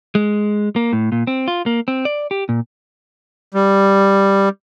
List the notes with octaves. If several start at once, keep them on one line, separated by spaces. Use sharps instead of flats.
G#3
A#3
A2
A#2
C4
F4
A#3
C4
D5
G4
A#2
G3